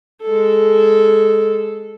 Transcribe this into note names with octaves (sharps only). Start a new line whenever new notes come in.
G#3 A4